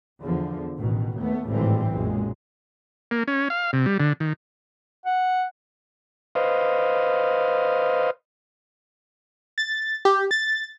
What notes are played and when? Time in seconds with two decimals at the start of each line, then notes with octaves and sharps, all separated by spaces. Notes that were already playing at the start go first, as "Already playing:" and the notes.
0.21 E2 D3 F3
0.78 A1 B2 D#3
1.17 D#2 A3 B3
1.48 G#1 A2 D3 E3 G3 C4
1.92 B1 F#2 A#2 G#3
3.11 A#3
3.28 C#4
3.50 F5
3.73 C3
3.86 G3
4.00 D3
4.20 D#3
5.06 F#5
6.35 B4 C5 D#5 F5
9.58 A6
10.05 G4
10.31 A6